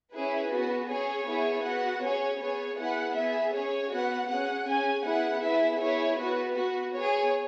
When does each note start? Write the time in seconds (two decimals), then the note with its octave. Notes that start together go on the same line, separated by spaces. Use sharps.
0.13 C#4 E4 G#4 B4
0.52 B3 F#4
0.89 C#4 G#4 C#5
1.26 B3 E4 G#4
1.64 B3 F#4 F#5
2.03 C#4 G#4 C#5
2.40 B3 G#4 C#5
2.78 B3 E4 G#4 F#5
3.15 B3 G#4 E5
3.54 C#4 G#4 C#5
3.92 B3 F#4 F#5
4.29 C#4 G#4 F#5
4.67 C#4 G#4 G#5
5.05 B3 E4 G#4 F#5
5.42 B3 E4 G#4 E5
5.80 B3 E4 G#4 C#5
6.18 B3 F#4 B4
6.56 B3 F#4
6.93 B3 G#4 C#5